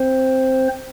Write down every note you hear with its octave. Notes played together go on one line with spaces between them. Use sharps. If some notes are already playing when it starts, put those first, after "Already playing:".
Already playing: C4 C5